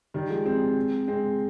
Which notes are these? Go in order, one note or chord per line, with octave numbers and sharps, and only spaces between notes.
D#3 G3
F3 G#3
G#3 C4
G#3 C4